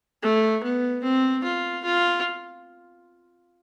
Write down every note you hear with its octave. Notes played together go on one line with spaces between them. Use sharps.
A3
B3
C4
F4
F4